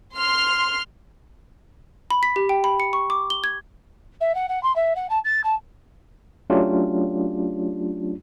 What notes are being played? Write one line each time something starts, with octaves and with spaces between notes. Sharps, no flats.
C6 F6
B5
B6
G4
G5
B5
C#7
C#6
D6
G7
G#6
E5
F#5
F#5
C6
E5
F#5
A5
A6
A5
F#3 A3 C#4 D4 F4 G4